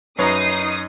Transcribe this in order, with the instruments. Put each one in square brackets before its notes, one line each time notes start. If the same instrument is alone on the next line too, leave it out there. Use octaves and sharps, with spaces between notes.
[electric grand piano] F#2 C#5 [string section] D#4 D#6 C7 [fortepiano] B4 A#5